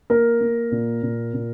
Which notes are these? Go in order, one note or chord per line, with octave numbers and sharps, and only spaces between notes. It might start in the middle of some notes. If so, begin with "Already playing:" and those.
A#3 A#4
A#3
A#2
A#2
A#2